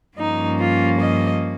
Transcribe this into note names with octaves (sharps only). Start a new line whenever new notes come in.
G2 F3 A#3 C#4 D#4
F4
D#5